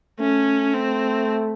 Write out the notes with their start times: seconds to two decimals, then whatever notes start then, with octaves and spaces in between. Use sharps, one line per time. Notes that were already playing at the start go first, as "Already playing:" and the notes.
0.19 A3 C#4
0.74 C4